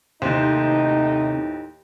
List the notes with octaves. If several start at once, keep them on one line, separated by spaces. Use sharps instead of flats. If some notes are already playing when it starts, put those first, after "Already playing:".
D#2 A2 C3 D#4 C5